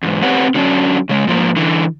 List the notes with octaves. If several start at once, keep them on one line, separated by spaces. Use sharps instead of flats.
E2 G#2
C4 G4 B4 C#5 F#5
D3 F#3 C#4 D4
C#3 G#3
G#2 F3 A#3
D3 E3